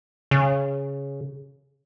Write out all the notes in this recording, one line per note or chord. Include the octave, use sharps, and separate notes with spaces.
C#3